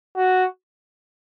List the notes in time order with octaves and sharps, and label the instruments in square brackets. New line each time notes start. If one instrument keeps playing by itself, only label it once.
[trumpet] F#4